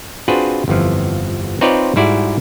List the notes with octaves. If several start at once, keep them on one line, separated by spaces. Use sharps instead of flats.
C4 D4 F4 F#4 G#4 B4
G1 F2 E3 F3
C4 D#4 F4 B4 C#5 D5
G#2 G3 E4 F#4 D5